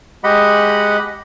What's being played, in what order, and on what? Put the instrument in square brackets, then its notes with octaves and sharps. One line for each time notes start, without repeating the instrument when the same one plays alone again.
[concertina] G#3 G4 D#5 F#5 B5